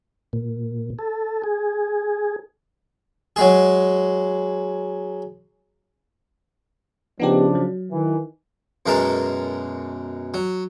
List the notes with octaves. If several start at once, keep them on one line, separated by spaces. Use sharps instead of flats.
A#2
A4
G#4
F#3 G#3 G#4
C#3 F3 B3 D4 D#4 G4
F#3
D#3 E3
F#2 B2 G#3 A#4 A5 A#5
F#3